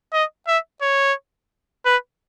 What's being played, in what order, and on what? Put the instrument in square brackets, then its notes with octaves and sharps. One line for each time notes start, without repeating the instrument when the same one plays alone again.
[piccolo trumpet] D#5
E5
C#5
B4